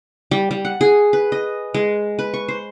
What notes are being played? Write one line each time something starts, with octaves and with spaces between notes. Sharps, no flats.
G3
G3
F#5
G#4
B4
D#5
G#3
B4
C#6
C5